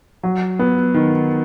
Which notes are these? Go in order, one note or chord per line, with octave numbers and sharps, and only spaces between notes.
F#3
B3
D#3